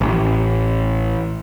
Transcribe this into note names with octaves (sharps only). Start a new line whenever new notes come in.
A1